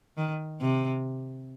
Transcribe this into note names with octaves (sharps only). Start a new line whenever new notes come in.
D#3
C3